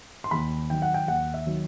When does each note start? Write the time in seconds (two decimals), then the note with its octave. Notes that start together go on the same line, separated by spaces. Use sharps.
0.24 C6
0.31 D#2 B5
0.70 D#3 F#3 G5
0.82 F#5
0.94 G5
1.08 D#2 F#5
1.34 E5
1.46 D#3 F#3